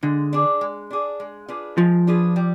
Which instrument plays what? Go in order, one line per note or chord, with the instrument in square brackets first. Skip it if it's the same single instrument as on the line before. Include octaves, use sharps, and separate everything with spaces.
[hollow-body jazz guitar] D3 [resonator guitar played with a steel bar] G#3
[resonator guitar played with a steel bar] D4 G#4
G#3
D4 G#4
G#3
D4 F4 G#4 B4
[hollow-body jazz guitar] F3 [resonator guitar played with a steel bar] G#3
[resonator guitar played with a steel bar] D4 F4 G#4 B4
G3